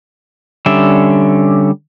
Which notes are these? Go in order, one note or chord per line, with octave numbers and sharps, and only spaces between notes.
D3 G3 C#4 E5